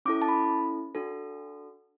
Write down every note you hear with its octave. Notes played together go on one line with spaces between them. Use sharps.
C#4 E4 A4 D6
A5
B5
D4 F#4 A4